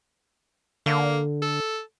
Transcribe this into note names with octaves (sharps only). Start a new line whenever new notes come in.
D3 A#3
A4